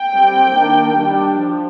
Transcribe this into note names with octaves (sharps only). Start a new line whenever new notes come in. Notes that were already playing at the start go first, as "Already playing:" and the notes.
Already playing: G5
G3 C4
D#3 A#3 D4
G3 D4
F3